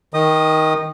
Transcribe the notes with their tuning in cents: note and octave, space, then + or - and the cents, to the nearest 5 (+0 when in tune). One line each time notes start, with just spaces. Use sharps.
D#3 +15 D#5 +10 D#6 -20